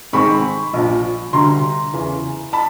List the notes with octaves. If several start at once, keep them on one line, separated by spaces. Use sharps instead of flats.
G#2 D#3 G#3 C4 B5 C#6
A#1 A#2 F3
D2 D3 G3 A#5 C6
E2 C#3 E3
A5 B5